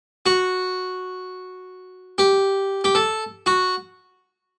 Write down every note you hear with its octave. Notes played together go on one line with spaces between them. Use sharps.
F#4
G4
G4
A4
F#4